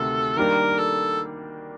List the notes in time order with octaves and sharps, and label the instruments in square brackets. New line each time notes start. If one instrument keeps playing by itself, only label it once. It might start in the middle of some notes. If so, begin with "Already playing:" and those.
Already playing: [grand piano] D2 C3 D#3 [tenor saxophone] A4
[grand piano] D#3 G3 A#3 D4 [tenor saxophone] A#4
[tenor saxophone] A4